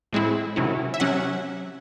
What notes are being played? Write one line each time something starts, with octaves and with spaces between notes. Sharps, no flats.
A2 G#3 C4 E4
C3 D#3 F#3 C#4 E4
E5
C3 F#3 C#4 F#5